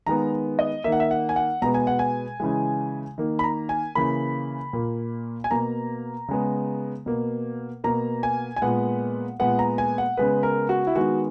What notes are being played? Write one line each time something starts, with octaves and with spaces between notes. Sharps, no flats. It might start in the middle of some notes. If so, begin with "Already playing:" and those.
D#3 G#3 B3 A#5
D#5
D#3 A#3 E5
F#5
E5
F#5
G#5
F#5
B2 G#3 B3 A#5
G#5
F#5
G#5
C#3 E3 G#3
D#3 A#3
B5
A#5
G#5
C#3 E3 A#3 B5
A#2 A#3
G#5
B2 A#3 A#5
C#3 G#3 B3
B2 A#3
B2 A#3 A#5
G#5
G#5
A#2 G#3 B3 F#5
A#2 G#3 B3 F#5
A#5
G#5
F#5
C#3 G#3 B3 B4
A#4
F#4
E4
D#3 G#3 B3 F#4